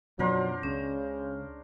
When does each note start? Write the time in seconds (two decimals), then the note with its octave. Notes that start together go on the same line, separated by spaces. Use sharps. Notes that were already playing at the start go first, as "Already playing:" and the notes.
0.19 F#2 B2 F3 F#3 D4 A#4 C5
0.63 C#2 C#3 C#4